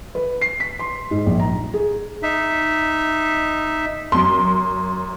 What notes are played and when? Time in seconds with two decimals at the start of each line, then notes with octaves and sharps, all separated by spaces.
0.15 B4
0.41 C7
0.60 B6
0.79 C6
1.11 G#2
1.26 A#1
1.40 A#5
1.74 G#4
2.23 D#4 E5
4.12 F#2 C6